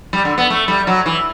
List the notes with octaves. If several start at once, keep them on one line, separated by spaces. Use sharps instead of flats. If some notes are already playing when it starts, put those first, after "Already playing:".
G3
D3
B3
A3
G3
F#3
E3